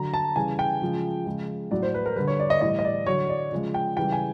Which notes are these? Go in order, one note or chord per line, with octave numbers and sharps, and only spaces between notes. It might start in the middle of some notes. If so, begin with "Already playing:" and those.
Already playing: D3 F#3 A#5
A5
C#3 E3 G3 G#5
G5
C#3 F3 G#3
C#3 F3 G#3
A2 F#3 D5
C5
B4
A#4
D3 G3 B4
C#5
D5
D#5
A2 E3 G3 D#5
D#5
D5
D3 F#3 C#5
D5
C#3 F3 G#3
G5
C#3 E3 G3 G5
G#5